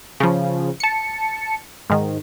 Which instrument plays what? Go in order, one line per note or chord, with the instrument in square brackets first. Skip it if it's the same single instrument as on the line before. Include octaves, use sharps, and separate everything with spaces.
[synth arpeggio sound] C#3 F3
A5 C#7
G#2 D#3